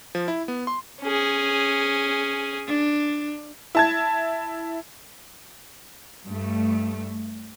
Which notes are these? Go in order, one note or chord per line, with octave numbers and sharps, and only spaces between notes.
F3
E4
B3
C6
C#4 G#4
D4
E4 A5 G#6
G2 A3